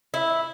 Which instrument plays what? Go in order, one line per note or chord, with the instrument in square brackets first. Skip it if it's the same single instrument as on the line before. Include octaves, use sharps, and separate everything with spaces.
[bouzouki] E4